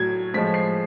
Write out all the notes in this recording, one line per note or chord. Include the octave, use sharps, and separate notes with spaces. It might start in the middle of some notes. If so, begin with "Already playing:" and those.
Already playing: A2 F#3 G#6
A2 F3 G#3 B6
C7